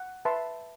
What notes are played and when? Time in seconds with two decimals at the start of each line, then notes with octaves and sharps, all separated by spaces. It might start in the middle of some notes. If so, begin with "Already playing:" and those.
Already playing: F#5
0.25 B4 E5 A5 C6